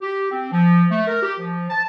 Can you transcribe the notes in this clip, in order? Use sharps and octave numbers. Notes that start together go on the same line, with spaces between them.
G4
C4
F3
A3
A#4
G4
F3
A5